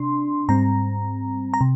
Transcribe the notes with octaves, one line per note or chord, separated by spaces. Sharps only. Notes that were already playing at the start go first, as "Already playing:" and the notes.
Already playing: C3 D4 C6
G#2 G3 C4 A#5
A#5
C3